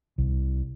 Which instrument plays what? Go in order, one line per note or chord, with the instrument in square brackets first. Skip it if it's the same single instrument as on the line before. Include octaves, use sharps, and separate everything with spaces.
[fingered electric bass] C2